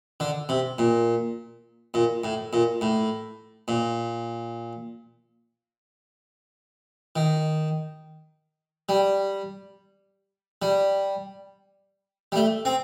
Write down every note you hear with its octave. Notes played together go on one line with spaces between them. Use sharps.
D3
C3
A#2
A#2
A2
A#2
A2
A#2
D#3
G3
G3
G3
A3
C4